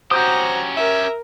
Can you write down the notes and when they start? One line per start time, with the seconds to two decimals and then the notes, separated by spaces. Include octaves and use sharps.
0.11 C#4 F#4 G4 C5 A#5 D#6 G6
0.77 A#4 E5